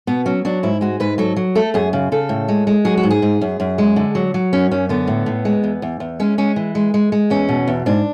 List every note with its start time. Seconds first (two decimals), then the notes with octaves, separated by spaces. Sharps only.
0.07 B2 B3
0.26 F#3 C#4
0.45 F#3 D4
0.63 G#2 E4
0.81 G#3 F#4
1.00 G#2 B4
1.18 F#3 A4
1.36 F#3
1.55 A3 A4
1.74 F#2 G#4
1.93 C#3
2.12 C#3 A4
2.29 A2
2.48 G#3
2.67 G#3
2.85 F#3 G#4
2.97 F#4
3.03 G#2
3.11 G#4
3.22 G#2
3.41 F#2
3.60 F#2
3.78 G#3
3.96 D3
4.15 F#3
4.34 F#3
4.53 F#2 C#4
4.71 F#2 C#4
4.89 D3 B3
5.07 A2
5.26 A2
5.45 G#3
5.63 E2
5.82 E2
6.00 E2
6.20 G#3 C#4
6.38 G#3 C#4
6.56 E3
6.75 G#3
6.94 G#3
7.12 G#3
7.30 E2 C#4
7.49 B2
7.67 E2
7.86 G#2 D4